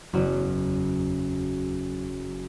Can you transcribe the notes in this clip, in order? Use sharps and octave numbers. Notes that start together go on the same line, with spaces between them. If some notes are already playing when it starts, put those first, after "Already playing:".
F#1 E2 F#3